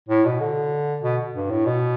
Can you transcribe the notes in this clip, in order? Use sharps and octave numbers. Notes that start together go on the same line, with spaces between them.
A2
B2
D3
B2
G2
A2
B2